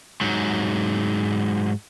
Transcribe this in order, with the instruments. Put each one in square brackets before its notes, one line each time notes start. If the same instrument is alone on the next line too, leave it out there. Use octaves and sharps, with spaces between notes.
[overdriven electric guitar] G#2 F#3